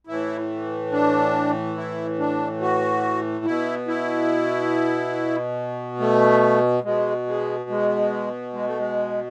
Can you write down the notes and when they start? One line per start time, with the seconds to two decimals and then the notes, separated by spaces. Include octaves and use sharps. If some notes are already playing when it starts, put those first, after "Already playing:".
0.07 A2 E3 E4
0.92 D4
1.77 E4
2.19 D4
2.61 F#4
3.45 B2 E4
3.88 E4
6.00 A3
6.84 B2 G#3
7.26 G#3
7.70 G#3
8.53 G#3
8.66 A3
8.78 G#3